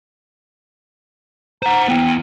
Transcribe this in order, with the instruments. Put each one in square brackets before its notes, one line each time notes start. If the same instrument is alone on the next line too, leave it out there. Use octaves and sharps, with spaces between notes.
[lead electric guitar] C5 F#5 [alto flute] A#5
[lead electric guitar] B3 E4 [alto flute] G5